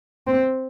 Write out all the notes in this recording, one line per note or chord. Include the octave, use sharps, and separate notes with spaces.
C4